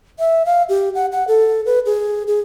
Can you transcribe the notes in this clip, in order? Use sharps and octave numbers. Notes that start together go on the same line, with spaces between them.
E5
F5
G4
F#5
F#5
A4
B4
G#4
G#4